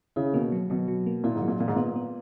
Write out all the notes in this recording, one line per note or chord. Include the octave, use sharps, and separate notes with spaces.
C#3 E4
B2 A#3
F#3
B2 F#3
F#3
A#3
A#2 E4
G#2
F#3
A#2
A#2 E3
G#2
A#2 B3
B3